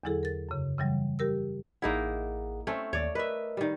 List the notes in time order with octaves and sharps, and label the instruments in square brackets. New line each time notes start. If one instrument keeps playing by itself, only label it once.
[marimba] E2 D3 F#3 E4 G#4 A4
A#4 A6
F#2 C#3
C#3 E3 F#3 G3
G3 G4 A#4 E6
[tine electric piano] A1 G#4 F#5 [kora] A#3 D#4 E4
[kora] A3 C4 C#4
[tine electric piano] D#2 [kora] C#5 D5
[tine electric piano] A#4 D#5 [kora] B4 E5
[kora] D#3 G3